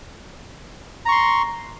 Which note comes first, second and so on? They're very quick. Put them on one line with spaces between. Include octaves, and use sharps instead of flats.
A#5 C#6 C6